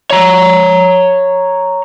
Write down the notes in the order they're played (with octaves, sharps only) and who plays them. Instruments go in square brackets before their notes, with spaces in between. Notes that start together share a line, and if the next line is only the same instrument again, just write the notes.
[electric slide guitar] C#5 A#5